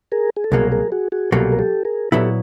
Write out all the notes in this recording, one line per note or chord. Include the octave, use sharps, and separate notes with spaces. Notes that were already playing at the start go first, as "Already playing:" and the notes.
G#4 A#4
G#4
A4
C2 B2 F#3 A#3 G#4 A#4
G#4 A#4
F#4 G#4
F#4 G#4
C2 B2 F#3 A#3 G4 A4
A#4
G4 A4
G#4 A#4
A#2 F#3 B3 E4 G4 A4